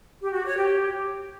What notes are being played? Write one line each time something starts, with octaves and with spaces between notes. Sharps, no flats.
G4
F#4
C#5
G4